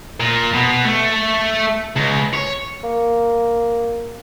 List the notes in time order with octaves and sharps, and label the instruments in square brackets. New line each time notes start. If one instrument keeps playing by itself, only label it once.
[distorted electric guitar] A#2
B2
A3
C#2
C#5
[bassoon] A#3